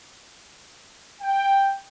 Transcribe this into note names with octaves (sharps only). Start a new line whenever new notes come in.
G5